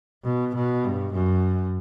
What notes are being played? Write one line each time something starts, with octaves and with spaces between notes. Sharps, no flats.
B2
B2
G2
F#2